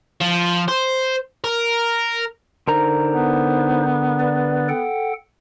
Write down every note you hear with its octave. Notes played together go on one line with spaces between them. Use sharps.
F3
C5
A#4
D3 D#4 A#4 C5 A#5
B3
B4 D5
A4 F#5 G5